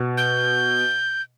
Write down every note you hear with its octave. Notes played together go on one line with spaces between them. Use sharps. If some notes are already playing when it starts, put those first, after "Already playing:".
Already playing: B2
G6